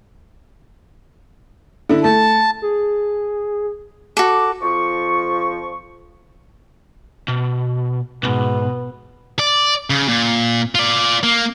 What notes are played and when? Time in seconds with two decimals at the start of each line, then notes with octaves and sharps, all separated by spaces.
1.89 D3 E4
2.04 A3 A5
2.62 G#4
4.17 F#4 A4 D6
4.62 F2 F3 C#6
7.28 B2
8.23 B1 G#2 B2 B3
9.39 D5
9.90 C#3
10.08 A#2
10.75 F4 D5
11.23 A#3